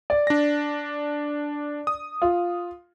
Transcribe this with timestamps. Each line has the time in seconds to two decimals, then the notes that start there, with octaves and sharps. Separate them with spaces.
0.10 D5
0.27 D4 A#6
1.87 D#6
2.22 F4